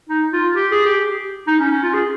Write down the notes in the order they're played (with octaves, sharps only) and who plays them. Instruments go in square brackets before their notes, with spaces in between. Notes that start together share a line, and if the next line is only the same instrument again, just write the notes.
[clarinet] D#4
F4
G4
G#4
G4
D#4
C#4
C#4
F4
G#4